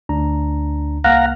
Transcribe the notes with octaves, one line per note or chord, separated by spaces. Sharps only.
D2 D4 A#5
C2 A#3 F5 F#5 A#5